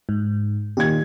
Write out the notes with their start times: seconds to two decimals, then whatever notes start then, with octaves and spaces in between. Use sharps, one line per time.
0.09 G#2
0.77 A#2 D#3 G4 G#6